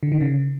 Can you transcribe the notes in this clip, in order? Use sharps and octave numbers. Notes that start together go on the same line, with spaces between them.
D3
D#3
C#3